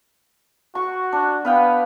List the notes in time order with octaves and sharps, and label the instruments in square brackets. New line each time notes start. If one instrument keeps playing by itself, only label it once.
[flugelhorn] F#4 [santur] C#6
[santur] D4
[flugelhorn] B3 [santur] B4 F5 G5